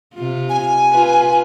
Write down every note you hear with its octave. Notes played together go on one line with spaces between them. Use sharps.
C3 F4
G#5
F4 B4